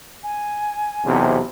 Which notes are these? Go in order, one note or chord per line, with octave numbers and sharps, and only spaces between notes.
G#5
B1 E2 C3